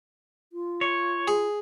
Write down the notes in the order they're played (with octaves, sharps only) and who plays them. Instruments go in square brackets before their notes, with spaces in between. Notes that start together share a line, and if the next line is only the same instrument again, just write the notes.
[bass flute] F4
[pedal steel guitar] C#5
[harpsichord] G#4